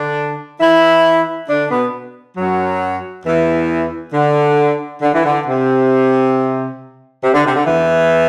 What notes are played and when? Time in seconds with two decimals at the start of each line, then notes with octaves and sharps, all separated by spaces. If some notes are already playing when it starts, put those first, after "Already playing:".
Already playing: D3 D4
0.60 E3 E4
1.49 D3 D4
1.70 B2 B3
2.36 F#2 F#3
3.24 E2 E3
4.13 D3
5.02 D3
5.13 E3
5.25 D3
5.46 C3
7.23 C3
7.33 D3
7.45 C3
7.55 D3
7.66 E2 E3